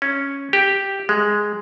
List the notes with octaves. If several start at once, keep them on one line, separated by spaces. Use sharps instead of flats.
C#4
G4
G#3